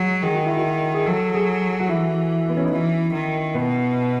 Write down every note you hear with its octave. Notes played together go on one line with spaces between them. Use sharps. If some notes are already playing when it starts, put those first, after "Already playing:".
Already playing: F#3 G#3
D#3 G#4
F#4
E4
F#4
G#4
F#3 A4
G#4
F#4
E3 E4
B3
C#4
D#4
E3 E4
D#3
B2 B3